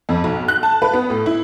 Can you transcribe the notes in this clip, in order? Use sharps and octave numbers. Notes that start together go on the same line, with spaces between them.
F2
B1
F#6
A5
B4
B3
A2
E4